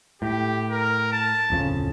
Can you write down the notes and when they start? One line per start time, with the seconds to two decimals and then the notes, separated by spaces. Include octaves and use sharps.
0.22 A2 G4
0.70 A#4
1.12 A5
1.50 D1 F2 C#3